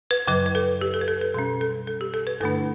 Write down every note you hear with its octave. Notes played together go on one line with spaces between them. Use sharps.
B4
F#2 C#3 F#3 B4
B4
A4
G4
A4
B4
A4
A4
B2 G3 C#4 A4
A4
A4
G4
A4
B4
G2 D3 A3 D4 A4